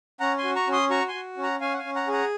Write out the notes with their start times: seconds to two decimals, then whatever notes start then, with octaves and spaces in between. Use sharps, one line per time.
0.20 C#4 F#5 A#5
0.38 G#5 C6
0.44 F#4
0.56 A#5 C#6
0.67 C#4
0.73 C6 D#6
0.90 F#4 A#5 C#6
1.08 G#5 C6
1.14 F#4
1.37 C#4
1.43 F#5 A#5
1.61 C#4 F5 G#5
1.74 F#5
1.78 F5 G#5
1.84 C#4
1.95 F#5 A#5
2.08 G#4
2.13 F#5 A#5